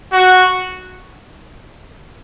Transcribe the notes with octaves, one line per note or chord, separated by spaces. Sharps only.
F#4